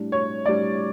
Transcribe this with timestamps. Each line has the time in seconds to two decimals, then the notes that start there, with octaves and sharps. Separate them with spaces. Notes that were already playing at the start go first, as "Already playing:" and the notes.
Already playing: A2 G3 D4
0.12 C#5
0.46 A2 G3 D4 D5